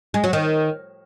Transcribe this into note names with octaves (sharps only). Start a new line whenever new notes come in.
G#3
F#3
D#3